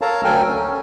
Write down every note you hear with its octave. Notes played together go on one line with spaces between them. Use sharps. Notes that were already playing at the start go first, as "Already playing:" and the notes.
A4 A#4 C#5 F5 A5 A#5
D2 F#3 A4 A#4 G5 G#5
C#4